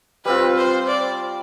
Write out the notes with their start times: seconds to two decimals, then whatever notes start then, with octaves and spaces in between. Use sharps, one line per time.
0.25 G3 C4 F4 B4
0.57 C5
0.87 D5